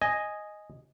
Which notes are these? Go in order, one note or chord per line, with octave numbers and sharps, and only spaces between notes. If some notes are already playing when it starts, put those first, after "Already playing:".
D#5 G#5